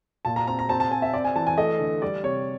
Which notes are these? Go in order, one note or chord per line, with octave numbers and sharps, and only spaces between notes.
A#2 A5
A#5
C4 A#5
A#5
C4 A5
A5
C4 G#5
E5
C4 D5
G#5
E3 A5
G#5
A3 D#5
D3
G3 D5
C3 C#5